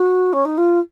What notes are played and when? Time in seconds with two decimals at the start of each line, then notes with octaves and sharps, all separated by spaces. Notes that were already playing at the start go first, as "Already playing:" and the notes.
Already playing: F#4
0.33 C#4
0.45 D#4
0.58 F4